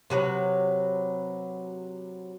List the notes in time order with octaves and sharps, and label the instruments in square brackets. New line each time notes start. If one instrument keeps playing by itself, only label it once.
[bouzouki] C3 F#3 B4